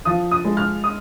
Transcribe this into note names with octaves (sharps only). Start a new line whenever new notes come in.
F3 D#6
D#6
G#3
F6
D#6